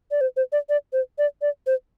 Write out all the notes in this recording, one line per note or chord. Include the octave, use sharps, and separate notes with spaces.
D5
C5
C5
D5
D5
C5
D5
D5
C5